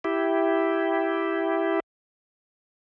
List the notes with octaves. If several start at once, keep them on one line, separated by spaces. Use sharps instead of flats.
E4 G4